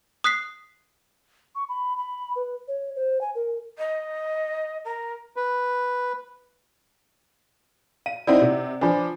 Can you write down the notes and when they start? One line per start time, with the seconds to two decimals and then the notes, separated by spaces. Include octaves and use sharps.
0.24 D#6 F#6 B6 C7
1.55 C#6
1.69 B5
1.97 B5
2.36 B4
2.68 C#5
2.96 C5
3.21 G#5
3.35 A#4
3.78 D#5
4.85 A#4
5.36 B4
8.06 F5 D#7
8.27 C4 D#4 E4 D5 F#5
8.42 C3
8.81 F3 D4 B4 G#5 B5